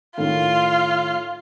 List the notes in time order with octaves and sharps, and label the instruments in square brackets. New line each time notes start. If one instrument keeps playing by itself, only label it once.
[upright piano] A2 D#3 [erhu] F4